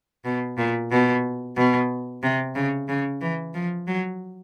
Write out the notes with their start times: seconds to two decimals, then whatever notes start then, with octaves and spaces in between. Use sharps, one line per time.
0.25 B2
0.58 A#2
0.91 B2
1.56 B2
2.23 C3
2.55 C#3
2.89 C#3
3.21 E3
3.54 F3
3.87 F#3